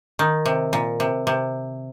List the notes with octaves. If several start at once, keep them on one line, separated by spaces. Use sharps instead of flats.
D#3
C3
A#2
C3
C3